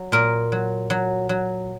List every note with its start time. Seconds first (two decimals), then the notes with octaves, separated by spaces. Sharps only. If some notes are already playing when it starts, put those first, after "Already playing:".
Already playing: F#3
0.12 A#2 A#4
0.52 F#3
0.90 F#3
1.29 F#3